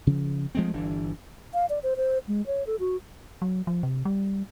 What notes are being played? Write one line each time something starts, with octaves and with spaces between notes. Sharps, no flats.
C#3 F3
F3 G#3 A3 C4
G1 E3 D4
F5
D5
C5
C5
G#3
C#5
A4
F#4
F#3
F3
C3
G3